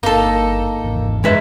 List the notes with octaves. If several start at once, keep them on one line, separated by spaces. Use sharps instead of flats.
G1 A#3 D#4 A4
G#1 E2
F#1 G#3 B4 E5